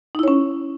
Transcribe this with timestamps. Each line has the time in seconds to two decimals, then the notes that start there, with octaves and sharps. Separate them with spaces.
0.15 D#4
0.19 E4
0.23 C#5
0.28 C#4